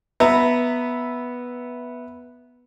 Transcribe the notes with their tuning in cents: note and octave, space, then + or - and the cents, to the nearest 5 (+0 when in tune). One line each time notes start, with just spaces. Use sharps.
B3 -5 E5 +0 A#5 -15